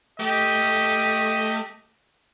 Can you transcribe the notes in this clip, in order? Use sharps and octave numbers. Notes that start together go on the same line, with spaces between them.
A3 G4 D#5